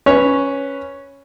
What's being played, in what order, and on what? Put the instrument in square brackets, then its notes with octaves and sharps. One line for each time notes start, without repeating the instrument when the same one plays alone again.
[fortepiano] C#4 B4 C#5